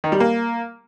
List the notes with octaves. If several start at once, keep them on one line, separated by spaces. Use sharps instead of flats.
D#3
G3
A#3